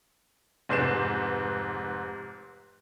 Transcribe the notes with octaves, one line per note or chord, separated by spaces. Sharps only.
F1 G#2 B4 G6 C7 E7